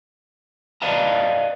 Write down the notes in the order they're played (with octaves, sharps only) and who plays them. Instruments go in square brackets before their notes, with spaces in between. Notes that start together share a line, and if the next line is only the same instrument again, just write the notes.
[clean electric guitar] B4 D5 D#5 F5 A5 A#5